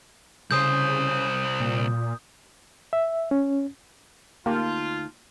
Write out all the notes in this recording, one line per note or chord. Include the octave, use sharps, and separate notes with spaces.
C2 C#3 C5 D#6 G6
A#2
E5
C#4
D2 A#3 D#4 F4 G4 A5